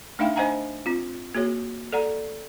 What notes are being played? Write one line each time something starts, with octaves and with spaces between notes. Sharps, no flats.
A3 D4 D#4 E5 F5 G5
D4 C5 D#5 F#5 G#5 A#5
C4 F4
A#3 F#4 G#4 C#5
A4 D5 F#5 A#5